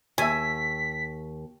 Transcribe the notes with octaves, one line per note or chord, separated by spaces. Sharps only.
D#2 E5 G#5 B6